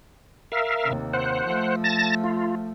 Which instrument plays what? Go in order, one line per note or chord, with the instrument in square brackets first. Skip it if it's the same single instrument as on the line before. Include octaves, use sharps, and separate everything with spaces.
[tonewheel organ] A#4 E5 F5
[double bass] D#2 C3
[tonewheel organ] C5 F#5
[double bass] F3 A3
[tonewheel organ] A5 A6 A#6
F4